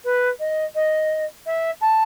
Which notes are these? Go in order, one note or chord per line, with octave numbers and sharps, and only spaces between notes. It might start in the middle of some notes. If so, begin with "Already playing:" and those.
B4
D#5
D#5
E5
A5